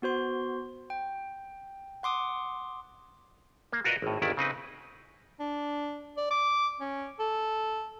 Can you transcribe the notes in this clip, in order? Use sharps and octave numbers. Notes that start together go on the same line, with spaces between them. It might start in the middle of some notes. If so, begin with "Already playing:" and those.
B3 F#4 C5 C6
G5
F#5 C6 D6 D#6
A#3
F4 F#4 A#4 B4 D5 D#5
G#1 A2
G1 D#2 D#3 E4 D5
C#3 C4 D#4 B4
D4
D5
D6
C#4
A4